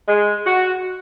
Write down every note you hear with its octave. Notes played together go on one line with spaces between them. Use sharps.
G#3
F#4